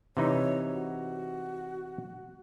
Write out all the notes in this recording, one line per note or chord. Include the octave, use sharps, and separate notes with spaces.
C3 E3 D#4 C#5
F#4